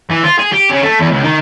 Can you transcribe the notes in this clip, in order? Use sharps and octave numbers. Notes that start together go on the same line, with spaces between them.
E3
F4
G#4
G4
C#3
A3
E2
C#2
D#3